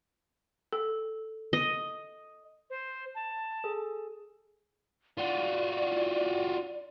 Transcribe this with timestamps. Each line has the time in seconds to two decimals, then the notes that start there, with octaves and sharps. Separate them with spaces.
0.73 A4
1.53 D#5
2.70 C5
3.15 A5
3.64 G#4 A4
5.18 F4 F#4 D5